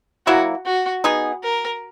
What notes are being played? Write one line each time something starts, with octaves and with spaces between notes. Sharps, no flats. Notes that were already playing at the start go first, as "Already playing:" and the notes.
F#3 A#3 E4 F#4
F#4
B3 D#4 G#4
A#4